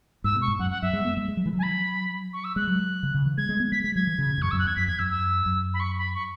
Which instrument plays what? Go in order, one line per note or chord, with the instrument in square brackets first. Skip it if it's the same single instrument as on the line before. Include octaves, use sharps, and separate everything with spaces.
[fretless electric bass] G#2 [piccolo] E6
[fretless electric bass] B2
[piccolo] C#6
[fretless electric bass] G#2
[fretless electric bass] F#2 [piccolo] F#5
[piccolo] F#5
[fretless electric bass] F#2 [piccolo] E5
[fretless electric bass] G#3
B3
G#3
G#3
F#3
E3
F#3
[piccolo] G#5
B5
C#6
E6
[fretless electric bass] G#3 [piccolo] F#6
[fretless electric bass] F#3
C#3
C#3
E3
[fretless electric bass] G#3 [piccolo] G#6
[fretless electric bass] G#3
B3
[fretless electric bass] G#3 [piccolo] B6
[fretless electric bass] G#3 [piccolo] B6
[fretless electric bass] F#3 [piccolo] G#6
[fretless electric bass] E3
C#3
B2
G#2
[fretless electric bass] F#2 [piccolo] C#6
[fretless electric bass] F#2 [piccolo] E6
[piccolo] F#6
[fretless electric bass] E2 [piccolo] G#6
[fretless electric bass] F#2 [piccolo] B6
[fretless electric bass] E2 [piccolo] G#6
[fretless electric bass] F#2 [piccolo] E6
[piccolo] E6
[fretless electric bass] F#2
[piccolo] B5
C#6
B5
C#6